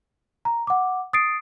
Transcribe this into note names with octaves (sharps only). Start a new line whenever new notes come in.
A#5
F#5 D6
D#6 A6 C7 D7